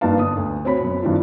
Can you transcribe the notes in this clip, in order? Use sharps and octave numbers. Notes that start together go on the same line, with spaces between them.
G2 A#3 D#4 B4 F5 A5
G1 D#6
D2
C4 F#4 C#5 B5
F#2 B2
G2 D#3 C4 D4 E4 F4